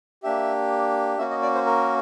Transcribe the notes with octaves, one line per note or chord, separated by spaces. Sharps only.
A#3 D4 G4 E5
A#3 C#4 F#4 E5
D#5
D5
C5
A#4